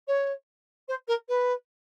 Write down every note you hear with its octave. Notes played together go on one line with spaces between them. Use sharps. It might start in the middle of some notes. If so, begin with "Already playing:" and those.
C#5
C5
A#4
B4